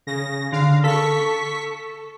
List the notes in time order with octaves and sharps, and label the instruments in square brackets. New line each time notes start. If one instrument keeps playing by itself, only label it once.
[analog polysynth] C#3 A#6
[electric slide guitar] D3 [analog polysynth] F5
[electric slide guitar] A4 [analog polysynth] C#6 B6